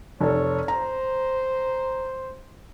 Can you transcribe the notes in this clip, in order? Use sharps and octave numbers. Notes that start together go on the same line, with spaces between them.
F1 A4 C#5
C5 A#5